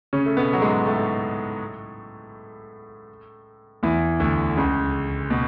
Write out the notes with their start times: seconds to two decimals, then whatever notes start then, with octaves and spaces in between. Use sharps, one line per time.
0.13 C#3 C#4
0.26 A3
0.37 B2 B3
0.53 F#3
0.62 G#2 G#3
0.87 A2 A3
3.83 E2 E3
4.20 D2 D3
4.57 C#2 C#3
5.30 B2